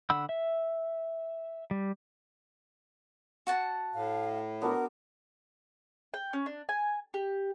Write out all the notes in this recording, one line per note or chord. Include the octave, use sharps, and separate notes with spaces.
D3 F#5 B5 E6
E5
G3
F#4 F#5 A5
A2 F5
B3 D4 F#4 A#4
G5
C#4
D4
G#5
G4